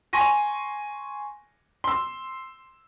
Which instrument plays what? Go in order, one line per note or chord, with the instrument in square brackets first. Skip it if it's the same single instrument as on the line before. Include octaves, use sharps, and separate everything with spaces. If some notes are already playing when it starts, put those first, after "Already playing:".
[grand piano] G#5 C6 C#6 A#6 D#7
C6 E6